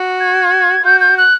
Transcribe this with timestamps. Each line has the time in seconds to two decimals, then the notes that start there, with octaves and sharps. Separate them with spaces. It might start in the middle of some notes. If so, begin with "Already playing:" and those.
Already playing: F#4
0.20 G#6
0.84 F#4 G6
1.00 G6
1.17 F#6